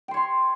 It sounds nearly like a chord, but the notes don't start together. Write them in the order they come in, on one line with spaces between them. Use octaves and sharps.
G5 C5 C#5 C6